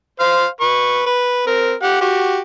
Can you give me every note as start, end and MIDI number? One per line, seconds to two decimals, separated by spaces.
0.20 0.46 72
0.20 0.46 77
0.61 1.05 71
0.61 1.05 85
1.06 1.44 71
1.47 1.74 60
1.47 1.74 70
1.82 2.00 67
1.82 2.00 78
2.01 2.40 66
2.01 2.40 67